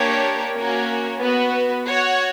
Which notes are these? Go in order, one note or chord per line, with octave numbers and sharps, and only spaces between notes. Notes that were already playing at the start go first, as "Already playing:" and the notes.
Already playing: A#3 D4 G4 A#4 C#5
A#3 C#4 F#4 C#5
B3 F#4 B4
F#4 C#5 F#5